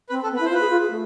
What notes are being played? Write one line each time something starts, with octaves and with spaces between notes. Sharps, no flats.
C4 B4
A4
B3
B4
E4
C5
F4
B4
G#4
F4
G#4
A3